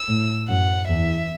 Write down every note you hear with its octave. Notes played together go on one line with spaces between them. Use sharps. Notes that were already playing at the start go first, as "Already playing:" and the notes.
Already playing: E6
A2
F#2 F#5
E2 E5